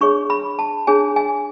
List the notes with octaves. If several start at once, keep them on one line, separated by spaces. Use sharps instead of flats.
D4 G#4 C#5 C#6
B5
A5
D4 G#4 C#5 G#5
G#5